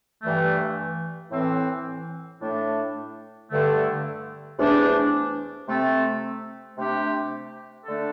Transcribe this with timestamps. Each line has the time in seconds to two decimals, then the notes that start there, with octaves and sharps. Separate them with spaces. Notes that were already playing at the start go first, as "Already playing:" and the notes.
0.22 G2 E3 A3
1.31 A2 E3 C4
2.41 A2 A3 D4
3.49 G2 D3 A3
4.58 E2 C3 A3 D4
5.67 C3 A3 C4 A4
6.76 C3 A3 D4 G4
7.85 D3 A3 D4 A4